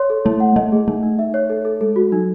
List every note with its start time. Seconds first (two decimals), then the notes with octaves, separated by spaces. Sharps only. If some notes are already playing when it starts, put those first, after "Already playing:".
Already playing: C#5 C6
0.10 A4
0.25 A3 E4
0.40 F#5
0.56 A3 D#5
0.72 G#4
0.88 A3 D#4
1.03 D#4
1.19 E5
1.34 C#5
1.50 A4
1.65 A4
1.81 G#3 A4
1.96 F#4
2.12 F#3 D#4